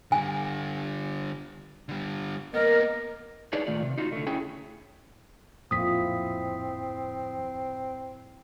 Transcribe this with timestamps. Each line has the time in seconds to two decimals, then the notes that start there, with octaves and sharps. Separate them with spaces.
0.12 D3 G3 G#5
1.89 D3 G3
2.54 A#3 B3 A#4 D#5
3.53 D4 D#4 G#4 B4 C#5 D5
3.67 A#2 D#3 A3 F4 D5
3.82 C3
3.98 D#4 F4 F#4
4.12 D3 A3
4.27 C#4 E4 G#4 G5
5.71 D1 F2 A#2 F3 C4 E4 D#6 B6